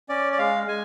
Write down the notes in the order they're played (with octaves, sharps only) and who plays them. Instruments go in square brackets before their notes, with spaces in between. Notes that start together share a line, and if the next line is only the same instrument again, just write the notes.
[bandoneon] C#4 D5
D5
G#3 F5
G#3 G#5